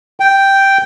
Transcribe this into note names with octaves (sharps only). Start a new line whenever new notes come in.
G5